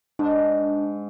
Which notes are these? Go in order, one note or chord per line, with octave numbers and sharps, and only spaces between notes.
G#2 D4